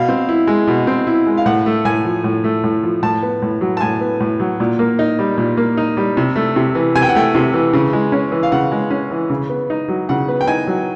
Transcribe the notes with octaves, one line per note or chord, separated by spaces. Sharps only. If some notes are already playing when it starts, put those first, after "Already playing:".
Already playing: B2 F5
C4
E4
G#3
B2
C4
E4
G#3
F5
A2 F#5
A3
A2 G#5
F3
A2
A3
A2
F3
A2 A5
B3
A2
F#3
A5
A2 G#5
B3
A2
F#3
A#2
A#3
D#4
G3
A#2
A#3
D#4
G3
C3
A3
C3
E3
C3 G#5
G5
F#5
A3 G5
C3
E3
C#3
G#3
C#4
E3
F5
C#3 F#5
G#3
C#4
E3
C#3
B3
D#4
F#3
C#3 F#5
B3
G5
D#4 G#5
F#3